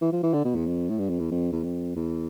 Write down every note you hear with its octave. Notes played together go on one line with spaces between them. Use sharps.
E3
F3
E3
D3
B2
E2
F2
A2
G2
F2
E2
F2
E2
F2
E2